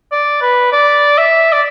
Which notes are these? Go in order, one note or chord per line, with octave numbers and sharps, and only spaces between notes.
D5
B4
D5
E5
D5